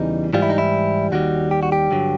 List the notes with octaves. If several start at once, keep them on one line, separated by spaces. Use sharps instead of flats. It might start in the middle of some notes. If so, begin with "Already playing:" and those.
Already playing: E2 C#3 E3 G3 D#4
G#2 E3 G3 F4
E4
D#4
E4
D#2 D#3 G3 F#4
G4
F#4
G4
G2 D3 F#3